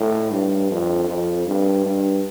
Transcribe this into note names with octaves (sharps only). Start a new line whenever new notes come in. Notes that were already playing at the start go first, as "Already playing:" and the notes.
Already playing: A2
G2
F2
F2
G2
G2